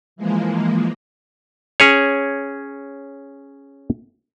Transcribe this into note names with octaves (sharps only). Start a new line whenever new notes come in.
E3 F3 G#3 A#3
C#4 G#4 C#5